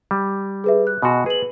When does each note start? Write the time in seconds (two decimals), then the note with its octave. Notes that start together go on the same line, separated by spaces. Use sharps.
0.11 G3
0.64 G#4 B4 E5
0.87 F#6
1.02 B2 F#4 D#5 G#5 C6
1.26 G#4 B4 F#7